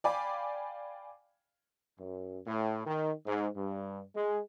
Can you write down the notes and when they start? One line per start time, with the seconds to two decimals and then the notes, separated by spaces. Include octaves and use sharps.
0.04 D5 F5 G5 G#5 B5 D6
1.99 F#2
2.46 A2
2.86 D#3
3.27 G#2
3.55 G2
4.15 G#3